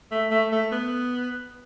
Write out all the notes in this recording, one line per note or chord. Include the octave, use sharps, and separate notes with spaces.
A3
A3
A3
B3